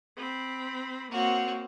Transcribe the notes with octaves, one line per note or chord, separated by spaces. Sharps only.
C4 B5
A#3 C4 F#4 C#5